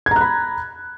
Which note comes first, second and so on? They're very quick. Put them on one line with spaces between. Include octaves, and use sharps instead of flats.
G#6 A#5 F#6 B5